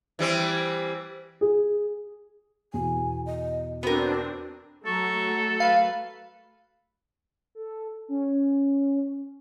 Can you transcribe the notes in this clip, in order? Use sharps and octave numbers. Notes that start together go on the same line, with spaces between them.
E3 G3 C4
G#4
E2 B2 G#5
D#5
B3 C4 D4 F#4 A#4
F#3 A3 A4 A#5 C#6
B4 F5
A4
C#4